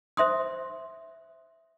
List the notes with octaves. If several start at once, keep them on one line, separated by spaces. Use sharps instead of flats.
C5 E5 C6 D#6